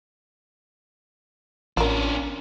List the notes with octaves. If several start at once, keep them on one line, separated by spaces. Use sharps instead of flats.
A1 C#4 D4 F4 A#4